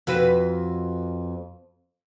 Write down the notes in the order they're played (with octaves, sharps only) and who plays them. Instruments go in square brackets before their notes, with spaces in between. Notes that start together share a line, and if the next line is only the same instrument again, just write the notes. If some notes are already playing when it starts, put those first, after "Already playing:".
[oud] F2 F#4 B4